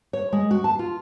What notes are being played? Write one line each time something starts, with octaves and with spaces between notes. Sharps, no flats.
C#5
G#3
F#4
A5
F4